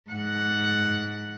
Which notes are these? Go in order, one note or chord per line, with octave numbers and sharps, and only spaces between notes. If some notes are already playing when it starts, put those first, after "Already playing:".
G#2 F#5